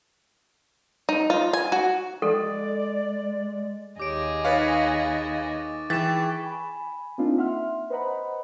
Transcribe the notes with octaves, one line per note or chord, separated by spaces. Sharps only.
D#4
F4
G#5
F#4
G#3 A4 D5
D#2 G4 G#4 C#5 D#5 D6 D7
D#4 B4 C#5 F5 C#6 A6
E3 G#4 G5 C#6 A6 B6 E7
G#5 B5
A#3 C4 D4 D#4 F4
E5 F#5 C6 F6
B4 C5 D#5 F#5 A#5 B5